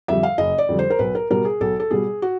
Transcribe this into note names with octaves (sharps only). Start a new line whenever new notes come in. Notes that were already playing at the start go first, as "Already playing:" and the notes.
F2 D3 G3 E5
F5
F#1 D#5
D5
F2 D3 G3
C5
A#4
B1 B4
A#4
B2 G3 A#4
G#4
B1 A4
A4
B2 G3 G#4
F#4